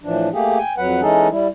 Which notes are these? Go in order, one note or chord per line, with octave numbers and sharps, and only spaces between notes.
A2 E3 F3 D4
A3 A#3 G4 G#4
G5 G#5
F2 F#3 B4 F#5
E3 G#3 C#4 D#4 G#4 A4
G3 E4